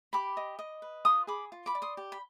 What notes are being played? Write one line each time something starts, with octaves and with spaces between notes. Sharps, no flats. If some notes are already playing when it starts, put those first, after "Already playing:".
G4 B5 D6
D#5
D#5
B4
F4 C6 D#6
G#4 B5 D6
F4
B5 D6
D5
C6 D#6
G4
B5